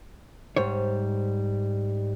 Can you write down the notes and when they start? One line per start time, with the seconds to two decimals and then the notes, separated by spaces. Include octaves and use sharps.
0.57 G#2 G3 C5 C#5